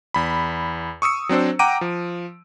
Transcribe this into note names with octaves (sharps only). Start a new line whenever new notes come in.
E2 B5
C#6 D#6 E6 C#7
F#3 C4 D4 C5
F#5 G5 A#5 D6 D7 D#7
F3